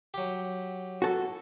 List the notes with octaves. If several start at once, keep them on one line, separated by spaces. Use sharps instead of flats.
F#3 G4
F#4 A4